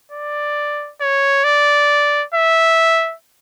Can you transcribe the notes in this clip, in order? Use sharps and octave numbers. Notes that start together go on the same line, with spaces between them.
D5
C#5
D5
E5